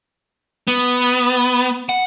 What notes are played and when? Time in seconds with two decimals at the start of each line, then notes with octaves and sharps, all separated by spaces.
0.68 B3
1.89 F#5